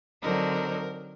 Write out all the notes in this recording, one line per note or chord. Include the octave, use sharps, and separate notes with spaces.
D3 F#3 C4 D#4 A#4